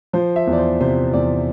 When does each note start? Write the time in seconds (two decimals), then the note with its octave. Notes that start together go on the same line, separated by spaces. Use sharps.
0.13 F3 C5
0.36 E5
0.47 E2
0.53 D5
0.58 C5
0.80 C3 C5
1.14 E2 D5